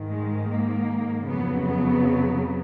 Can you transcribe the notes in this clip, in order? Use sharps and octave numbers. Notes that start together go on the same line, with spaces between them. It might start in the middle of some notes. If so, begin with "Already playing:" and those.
Already playing: G#2 D#3
G#3
A#3
F2 C#3 F#3 B3
B3